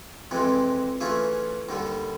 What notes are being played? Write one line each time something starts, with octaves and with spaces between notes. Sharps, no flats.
F2 C3 E3 G#3
E3 A3 C#4 F4 G#4
D#2 D3 G3